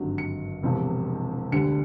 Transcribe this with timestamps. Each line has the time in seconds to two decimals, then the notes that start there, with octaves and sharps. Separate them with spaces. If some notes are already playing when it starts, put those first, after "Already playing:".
Already playing: G#1 G2 D3 F#3
0.18 C#7
0.63 E1 E2 C3 F3
1.52 D2 D3 G3 C#7